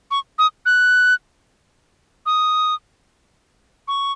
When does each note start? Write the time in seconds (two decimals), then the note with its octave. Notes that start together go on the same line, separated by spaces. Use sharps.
0.11 C#6
0.39 D#6
0.66 F#6
2.26 D#6
3.88 C#6